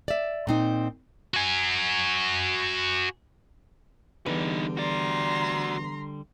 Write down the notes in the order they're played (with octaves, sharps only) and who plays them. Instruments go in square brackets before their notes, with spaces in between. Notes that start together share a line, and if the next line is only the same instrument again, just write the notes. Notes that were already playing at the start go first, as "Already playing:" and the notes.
[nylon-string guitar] D5 E5
A#2 C4 D#4
[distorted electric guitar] F#4 G#5
[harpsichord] E2 [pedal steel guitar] D3 G3 [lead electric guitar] D#4 B4
[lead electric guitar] F#4 D5 [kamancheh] A#5 C6